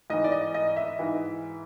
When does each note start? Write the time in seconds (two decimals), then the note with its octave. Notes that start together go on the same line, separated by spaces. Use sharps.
0.10 G#2 E3 D#5
0.24 D5
0.32 D#5
0.54 D#5
0.76 E5
0.99 G#2 E3